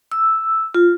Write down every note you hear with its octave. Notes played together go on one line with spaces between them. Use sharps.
E6
F4